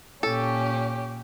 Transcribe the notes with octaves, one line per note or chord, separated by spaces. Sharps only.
A#2 C#4 G4 A4